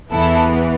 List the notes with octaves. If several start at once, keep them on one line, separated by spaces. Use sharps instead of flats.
E2 E3 B3 E4 A4